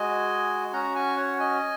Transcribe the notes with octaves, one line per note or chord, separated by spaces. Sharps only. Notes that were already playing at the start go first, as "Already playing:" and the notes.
Already playing: G#3 F#4 D#5 G#5
C#4 F#4 F#5 A#5
G#5 C#6
C#5 F#5
D#5 G#5